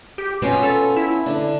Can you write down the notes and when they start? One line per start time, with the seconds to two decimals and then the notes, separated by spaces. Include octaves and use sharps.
0.18 G4
0.42 B2 B3 C#4 F4
0.63 A4
0.96 E4
1.26 D3 D4